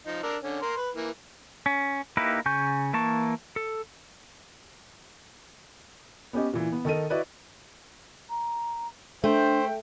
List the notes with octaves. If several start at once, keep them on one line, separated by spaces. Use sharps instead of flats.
F3 D#4
D4 A#4 E6
D3 C#4
A#4 C6
B4
E3 A#3
C#4
A#3 D#4 E4 G4 B4
C#3 G#5 C#6 G6
E3 A#3 A5 C#6
A4
B3 C#4 G4 D#5
A#2 E3
B3
D#3 A4 A#4 D#5 D#7
E4 F#4 B4 D5 D#5
A#5
A3 D4 C5 E5 G5